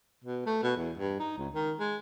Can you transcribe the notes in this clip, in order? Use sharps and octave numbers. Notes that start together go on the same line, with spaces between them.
B2
A3
B2
E2
G2
D#4
C#2
D#3
G#3